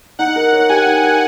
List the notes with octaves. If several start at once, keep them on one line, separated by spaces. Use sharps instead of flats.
D#4 F#5
A#4
C#5
G4 G#5
D#4
A#4